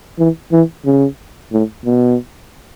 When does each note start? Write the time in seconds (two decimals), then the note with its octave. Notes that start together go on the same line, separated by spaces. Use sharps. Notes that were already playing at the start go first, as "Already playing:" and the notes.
0.19 E3
0.52 E3
0.85 C#3
1.52 A2
1.85 B2